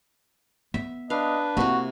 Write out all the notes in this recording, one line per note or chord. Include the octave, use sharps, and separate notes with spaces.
B3 E5
D4 B4 D#5 F5
C3 A#3 E4 F#4